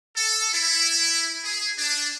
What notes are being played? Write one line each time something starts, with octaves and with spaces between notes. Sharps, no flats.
A4
E4
G#4
D4